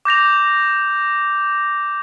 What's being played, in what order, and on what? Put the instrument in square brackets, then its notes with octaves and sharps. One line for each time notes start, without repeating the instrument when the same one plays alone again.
[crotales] D6 G6 A#6 F7